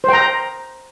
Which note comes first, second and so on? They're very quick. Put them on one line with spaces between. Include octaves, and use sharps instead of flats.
C5 G5 A#5